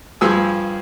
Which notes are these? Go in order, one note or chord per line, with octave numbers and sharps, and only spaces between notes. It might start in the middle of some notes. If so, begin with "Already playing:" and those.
G2 F3 G#4 E6